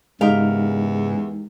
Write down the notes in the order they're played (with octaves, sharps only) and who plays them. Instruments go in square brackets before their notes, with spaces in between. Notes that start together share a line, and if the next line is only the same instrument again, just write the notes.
[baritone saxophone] E2 [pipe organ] G#2 C#3 [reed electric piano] G#3 D#4 [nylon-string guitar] G4 A#4 F5